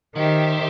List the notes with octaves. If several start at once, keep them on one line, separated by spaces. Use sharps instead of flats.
D#3 G4 C5 E5